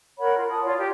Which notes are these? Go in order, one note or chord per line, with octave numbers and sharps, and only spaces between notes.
A#4 C#5 F#5 B5
F4
A5 D#6
F4 C#5 D5
G4